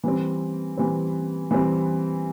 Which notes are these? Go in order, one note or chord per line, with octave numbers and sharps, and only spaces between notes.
E3 G3 C4
E3 G3 C4
E3 G3 C4